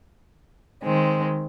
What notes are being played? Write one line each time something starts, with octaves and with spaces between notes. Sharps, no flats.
D#3 G#3 C4